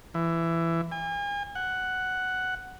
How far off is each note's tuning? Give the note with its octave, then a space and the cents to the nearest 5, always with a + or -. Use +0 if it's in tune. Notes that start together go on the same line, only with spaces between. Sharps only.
E3 +15
G#5 -40
F#5 +5